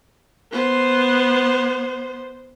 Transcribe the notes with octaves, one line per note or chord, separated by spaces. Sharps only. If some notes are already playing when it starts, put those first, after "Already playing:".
B3 C5